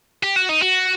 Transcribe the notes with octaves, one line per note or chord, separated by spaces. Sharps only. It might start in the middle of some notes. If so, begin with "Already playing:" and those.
G4
F#4
D#4
F#4